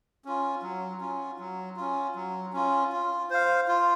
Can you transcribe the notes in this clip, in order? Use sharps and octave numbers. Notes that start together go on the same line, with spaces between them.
C#4 F4
F#3
C#4 F4
F#3
C#4 F4
F#3
C#4 F4
F4
C5 F5
F4